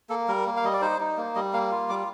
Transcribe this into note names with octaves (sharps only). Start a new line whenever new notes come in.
A#3 A4
G3 A#4
A#3
F5
G3 D#5
D5
D#4 C5
D#4
A#3
G3 D#5
A#3 F5
F4
G3 D6